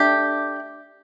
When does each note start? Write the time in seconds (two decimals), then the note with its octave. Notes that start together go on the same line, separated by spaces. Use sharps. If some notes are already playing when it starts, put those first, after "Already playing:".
Already playing: A3 D4 G4